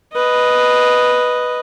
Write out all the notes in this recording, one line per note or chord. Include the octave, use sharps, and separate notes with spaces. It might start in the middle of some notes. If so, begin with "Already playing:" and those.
B4 D#5